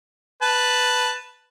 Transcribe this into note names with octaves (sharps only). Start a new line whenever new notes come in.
B4 A5